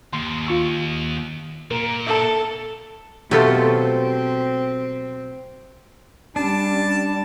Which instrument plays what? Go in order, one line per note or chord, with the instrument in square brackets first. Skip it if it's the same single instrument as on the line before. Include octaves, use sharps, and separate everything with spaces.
[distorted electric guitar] D#2 [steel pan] C6
[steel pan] F4 C#6 E6
[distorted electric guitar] A#2 [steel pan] A#4
[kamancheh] A4 [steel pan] E5 A5
[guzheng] B2 [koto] F#3 A3 F4 [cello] C4 [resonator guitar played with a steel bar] G4 A4 C5
[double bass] G3 [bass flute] C#4 [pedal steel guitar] D4 [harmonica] A5